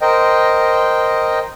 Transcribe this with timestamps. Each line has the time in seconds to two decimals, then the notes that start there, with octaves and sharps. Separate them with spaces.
0.01 A#4 C5 D#5 G5